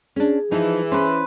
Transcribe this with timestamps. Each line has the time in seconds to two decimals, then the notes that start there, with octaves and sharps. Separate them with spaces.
0.16 C#4 D4 G#4
0.51 E3 F3 D#4
0.92 C#4 E4 B4 C5